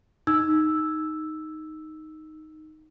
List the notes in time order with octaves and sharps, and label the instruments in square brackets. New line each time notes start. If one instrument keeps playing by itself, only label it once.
[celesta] D#4 E6